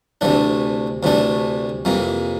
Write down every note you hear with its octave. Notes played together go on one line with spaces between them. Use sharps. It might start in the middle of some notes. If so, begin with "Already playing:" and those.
D2 C3 E3 A3 D4
D2 C3 E3 A3 D4
F2 C3 E3 A#3